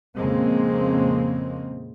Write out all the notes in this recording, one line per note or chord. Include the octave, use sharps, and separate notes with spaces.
F2 A#2 C#3 G#3 A#3 C4